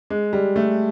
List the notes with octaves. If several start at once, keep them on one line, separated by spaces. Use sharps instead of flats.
G#3
G3
A3